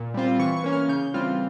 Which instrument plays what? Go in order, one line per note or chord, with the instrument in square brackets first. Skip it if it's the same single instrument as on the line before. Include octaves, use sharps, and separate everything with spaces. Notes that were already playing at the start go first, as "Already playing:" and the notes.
Already playing: [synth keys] A#2
G3 C4 F4
E3 C#6
C#6
A#3 C#4
F6
C#3 G6
E3 G3 C4 F4 F6